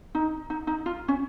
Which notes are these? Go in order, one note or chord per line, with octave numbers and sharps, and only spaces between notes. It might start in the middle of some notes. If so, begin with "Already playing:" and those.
D#4
D#4
D#4
F4
C#4